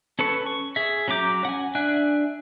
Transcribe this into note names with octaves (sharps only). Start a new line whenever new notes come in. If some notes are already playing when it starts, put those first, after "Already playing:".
C#4 A4 B4 C#6
C#6
G#4 E5
F#3 C#4 A#5 D6 G6
F#5 G#5
D4 E5 G#5 F#6